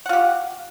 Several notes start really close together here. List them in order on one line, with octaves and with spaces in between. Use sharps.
F#5 F4 G4